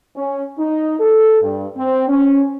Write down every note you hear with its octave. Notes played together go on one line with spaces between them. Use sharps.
C#4
D#4
A4
G2
C4
C#4